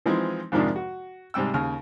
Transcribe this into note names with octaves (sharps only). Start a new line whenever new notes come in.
E3 F3 G#3 C4 D#4
F2 G#2 C3 D#3 F3 D4
F#4
G#2 C3 G3 G5 E6
D#2 C#3 F6